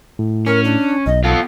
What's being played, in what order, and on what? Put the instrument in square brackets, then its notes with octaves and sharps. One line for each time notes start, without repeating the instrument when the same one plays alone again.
[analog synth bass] A2
[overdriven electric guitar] C#4 [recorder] A#4
[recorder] D4
[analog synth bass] B1 [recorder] D#5
[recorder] B3 [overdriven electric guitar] F4 A4